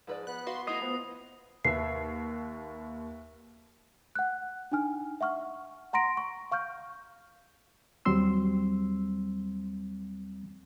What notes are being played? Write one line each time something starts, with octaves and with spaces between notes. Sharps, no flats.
G#2 F3 B4 D5
B3 F#6
F#4 B4 F5 C6
A3 E4 D#5 D#6 C7
F3 B3
D#2 B4 E5 C7
F#5 F#6
D4 D#4 G#5 F6
E5 F#5 C#6 F6
F#5 A#5 C6 A#6 D7
C#6
F5 C#6 F6 G6
D#2 F#3 G3 C4 C6 E6